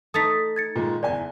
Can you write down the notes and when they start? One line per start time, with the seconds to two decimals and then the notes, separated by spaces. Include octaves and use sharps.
0.14 A3 D#4 D#6 A6 B6
0.56 G#6 A6 C#7
0.76 A#2 D#3 G#3 F4
1.03 F#1 E2 D5 G#5